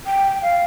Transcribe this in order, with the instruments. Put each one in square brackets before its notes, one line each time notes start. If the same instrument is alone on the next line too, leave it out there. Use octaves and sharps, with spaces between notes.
[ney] G5
F5